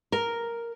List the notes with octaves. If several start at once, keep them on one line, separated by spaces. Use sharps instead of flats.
A#4